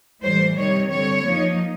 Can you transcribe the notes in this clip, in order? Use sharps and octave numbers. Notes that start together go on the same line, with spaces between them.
A2 E3 G3 C5
C3 D#3 G3 C#5
D3 G3 C4 C#5
F3 A#3 D#4